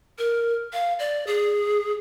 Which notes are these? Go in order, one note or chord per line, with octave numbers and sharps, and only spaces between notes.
A#4
F5
D5
G#4